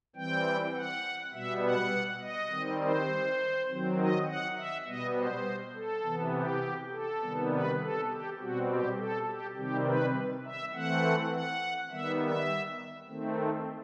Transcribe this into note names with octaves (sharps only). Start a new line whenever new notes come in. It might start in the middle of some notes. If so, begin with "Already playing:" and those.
E3 G3 C4 G5
F#5
B2 G3 B3 E5
F#5
D#5
D#3 G3 C4
C5
D#3 F#3 C4
D#5
F#5
E5
B2 G3 B3 D#5
C5
A4
C3 E3 B3
G4
A4
C3 D#3 G3 B3
B4
A4
G4
B2 G3 C4 F#4
G4
A4
G4
C3 D#3 G3 C4 G4
B4
E5
E3 A3 C4 F#5
F#5
D#3 G3 B3 E5
E5
D#3 A3 C4